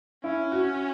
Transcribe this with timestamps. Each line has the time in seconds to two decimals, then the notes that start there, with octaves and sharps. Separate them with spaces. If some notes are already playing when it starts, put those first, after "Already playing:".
0.23 C#4 E4
0.52 F#4